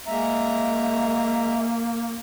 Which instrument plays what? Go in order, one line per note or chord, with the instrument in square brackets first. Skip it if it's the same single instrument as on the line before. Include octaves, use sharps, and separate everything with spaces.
[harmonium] G#3 E5 A#5 [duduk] A#3